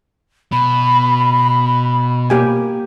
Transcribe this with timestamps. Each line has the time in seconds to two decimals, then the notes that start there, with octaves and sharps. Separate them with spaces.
0.52 B2 B5
2.30 A#3 G4 G#5